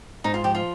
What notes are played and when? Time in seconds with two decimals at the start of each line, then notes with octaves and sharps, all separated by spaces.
0.24 G#2 D#4
0.34 F4
0.44 F3 G4
0.55 F4